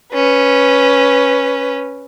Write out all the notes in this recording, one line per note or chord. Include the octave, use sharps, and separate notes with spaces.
C#4 B4